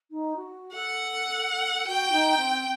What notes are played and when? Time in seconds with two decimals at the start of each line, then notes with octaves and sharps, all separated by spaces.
0.11 D#4
0.36 F#4
0.74 A4 F#5
1.87 F#4 G5
2.12 D#4
2.37 C4